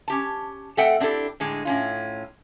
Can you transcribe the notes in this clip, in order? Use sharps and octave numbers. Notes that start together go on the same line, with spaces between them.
C#4 G4 A5
A3 C4 A4 E5 F#5 G5
C4 D4 E4 G4 A4
A2 D3 G#3
A2 C#4 F4